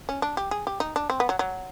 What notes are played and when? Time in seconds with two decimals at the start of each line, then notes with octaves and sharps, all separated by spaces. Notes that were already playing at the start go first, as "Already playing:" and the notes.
0.09 C#4
0.22 D4
0.37 G4
0.51 G#4
0.67 G4
0.80 D#4
0.96 D4
1.10 C4
1.20 B3
1.29 F#3
1.39 F#3